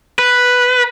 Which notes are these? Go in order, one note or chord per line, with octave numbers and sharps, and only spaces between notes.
B4